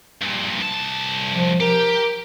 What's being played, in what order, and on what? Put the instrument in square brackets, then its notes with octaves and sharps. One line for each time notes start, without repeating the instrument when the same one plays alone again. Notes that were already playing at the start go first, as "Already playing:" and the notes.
[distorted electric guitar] G2 A#2
C2 A5
[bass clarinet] F3
[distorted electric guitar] G4 [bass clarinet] A#4